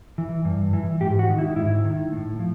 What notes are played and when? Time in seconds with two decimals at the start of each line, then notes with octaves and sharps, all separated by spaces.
0.18 E3
0.45 G2
0.73 E3
1.01 G#2 G4
1.19 F#4
1.29 D#3
1.39 E4
1.56 G#2 E4
1.85 D#3
2.12 A2
2.39 F3